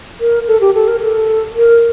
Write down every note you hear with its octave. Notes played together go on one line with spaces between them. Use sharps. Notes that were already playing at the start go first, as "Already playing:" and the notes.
A#4
A4
G4
A4
A#4
A4
A#4